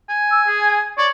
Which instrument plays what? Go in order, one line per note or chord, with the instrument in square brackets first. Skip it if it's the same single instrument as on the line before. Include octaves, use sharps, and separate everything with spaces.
[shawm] G#5
[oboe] E6
G#4
[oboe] C#5 [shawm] D5